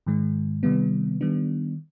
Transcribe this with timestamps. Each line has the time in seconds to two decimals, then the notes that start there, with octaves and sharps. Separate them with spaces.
0.06 G#2 D#3 G#3
0.63 C3 D#3 G3 B3
1.21 D#3 G3 B3 D4